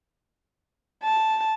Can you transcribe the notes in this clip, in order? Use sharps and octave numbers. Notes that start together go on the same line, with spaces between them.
A5